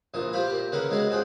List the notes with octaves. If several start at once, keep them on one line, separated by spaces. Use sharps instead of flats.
A#1 A#2 E3 D#6
F4 G4 C5 F5 B5
A#2 G4
C#3 E3 A#3 A#4 F#5 B5
C#3 G#3 B3 E4 F#4 G#4
F2 F#4 G#4 F#5 G5